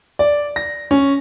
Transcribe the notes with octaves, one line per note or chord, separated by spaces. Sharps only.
D5
A#6
C#4